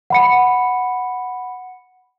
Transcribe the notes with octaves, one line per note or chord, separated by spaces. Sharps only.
F#5 B5 C#7